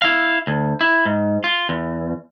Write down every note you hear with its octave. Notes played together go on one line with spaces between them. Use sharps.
E4 F5
D2
E4
G#2
F4
E2